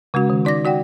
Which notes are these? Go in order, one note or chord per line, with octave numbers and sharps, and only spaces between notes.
C#3 G#3 C#4 F#4
D#3
D#4 D5 D6 A#6
F#4 D5 F#5 G5